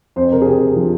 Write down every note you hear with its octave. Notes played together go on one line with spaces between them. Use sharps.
F2 C5
C3 A#4
G#4
C3 G4
C3
F3